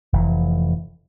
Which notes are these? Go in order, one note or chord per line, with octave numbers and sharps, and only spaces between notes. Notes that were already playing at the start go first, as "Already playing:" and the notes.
F1 E3